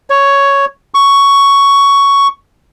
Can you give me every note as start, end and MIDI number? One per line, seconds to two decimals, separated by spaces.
0.10 0.65 73
0.94 2.27 85